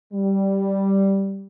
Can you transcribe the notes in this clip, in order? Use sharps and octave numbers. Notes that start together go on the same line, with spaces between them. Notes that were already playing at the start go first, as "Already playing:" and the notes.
G3